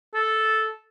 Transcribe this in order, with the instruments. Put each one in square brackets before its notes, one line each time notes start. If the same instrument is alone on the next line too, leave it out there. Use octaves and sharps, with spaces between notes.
[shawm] A4